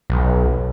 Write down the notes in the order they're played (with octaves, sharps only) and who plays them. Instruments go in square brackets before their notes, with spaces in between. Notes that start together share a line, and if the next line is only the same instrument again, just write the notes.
[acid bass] B1